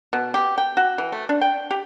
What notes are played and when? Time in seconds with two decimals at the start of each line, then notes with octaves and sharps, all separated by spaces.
0.13 B2
0.34 G4
0.58 G5
0.77 F#4
0.98 E3
1.12 A3
1.29 D4
1.41 G5
1.71 G4